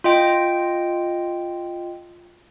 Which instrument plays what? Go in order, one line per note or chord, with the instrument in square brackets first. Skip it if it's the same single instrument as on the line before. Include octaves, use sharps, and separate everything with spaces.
[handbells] F4 D#5 G5